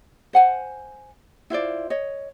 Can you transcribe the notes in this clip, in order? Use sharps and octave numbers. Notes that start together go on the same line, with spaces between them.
C5 F#5 G#5
E4 F4 C5 D5
C#5 D#5